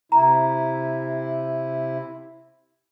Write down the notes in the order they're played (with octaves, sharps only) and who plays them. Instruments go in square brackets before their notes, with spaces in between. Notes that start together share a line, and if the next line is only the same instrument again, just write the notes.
[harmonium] C3 E4 [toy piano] A#5